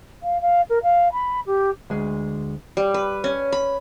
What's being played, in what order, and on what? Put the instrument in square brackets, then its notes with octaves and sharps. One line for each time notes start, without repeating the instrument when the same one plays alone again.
[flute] F5
F5
A#4
F5
B5
G4
[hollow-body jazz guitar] D2 G#3
[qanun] G3
B4
C#4
B5